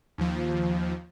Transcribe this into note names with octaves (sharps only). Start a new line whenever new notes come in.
D#2 F3